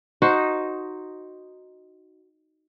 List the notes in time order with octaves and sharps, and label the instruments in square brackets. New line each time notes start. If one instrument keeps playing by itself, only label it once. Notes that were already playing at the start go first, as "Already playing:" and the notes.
[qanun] D#4 [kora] F#4 C5